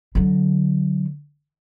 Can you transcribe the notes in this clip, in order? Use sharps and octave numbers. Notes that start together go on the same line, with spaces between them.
D3 F#3